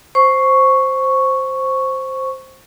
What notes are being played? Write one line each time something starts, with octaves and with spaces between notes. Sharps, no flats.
C5 C#6